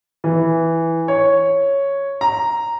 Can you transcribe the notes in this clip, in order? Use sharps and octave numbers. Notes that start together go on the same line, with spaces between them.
E3
C#5
A#5